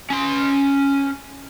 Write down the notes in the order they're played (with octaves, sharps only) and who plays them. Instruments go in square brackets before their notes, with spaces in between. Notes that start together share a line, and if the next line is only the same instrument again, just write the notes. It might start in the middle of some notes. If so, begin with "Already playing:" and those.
[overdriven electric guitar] C#4 C6